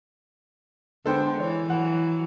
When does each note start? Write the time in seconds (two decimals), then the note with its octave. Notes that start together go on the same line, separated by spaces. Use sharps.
1.06 D3 G#3 B3 D4 A4 C5 G5
1.40 E3 C#5
1.70 E3 F#3 F#5